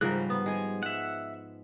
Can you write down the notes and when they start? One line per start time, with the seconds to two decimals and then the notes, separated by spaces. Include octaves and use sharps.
0.01 G#2 C#3 F3 G3 A#4 A#5 F#6
0.30 B3
0.46 G#3 G#5
0.83 E5 F#5